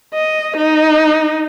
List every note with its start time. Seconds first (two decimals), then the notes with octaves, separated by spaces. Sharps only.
0.14 D#5
0.57 D#4